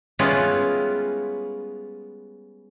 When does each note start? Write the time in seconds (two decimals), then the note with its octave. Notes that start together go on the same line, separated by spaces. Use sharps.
0.19 G3 G#3 B3 C#4 E4 F4